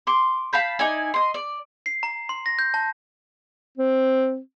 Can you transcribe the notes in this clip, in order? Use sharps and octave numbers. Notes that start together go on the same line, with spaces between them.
C6 D6
F5 A5 B5 G6
D#4 E4 D5 G#5
D#5 C6
D5
C7
A#5
C6
A#6
G6
A5
C4